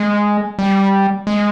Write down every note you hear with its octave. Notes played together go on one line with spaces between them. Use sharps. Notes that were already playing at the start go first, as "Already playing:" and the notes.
Already playing: G#3
G3
G#3